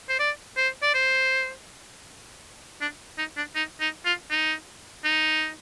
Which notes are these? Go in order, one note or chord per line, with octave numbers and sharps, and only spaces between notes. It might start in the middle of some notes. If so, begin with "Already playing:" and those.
C5
D5
C5
D5
C5
D4
D#4
D4
D#4
D#4
F4
D#4
D#4